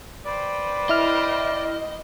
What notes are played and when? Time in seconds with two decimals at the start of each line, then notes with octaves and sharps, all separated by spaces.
0.25 B4 C5 D5 G5
0.89 E4 D#5 F6